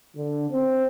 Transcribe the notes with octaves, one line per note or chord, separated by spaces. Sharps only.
D3
C4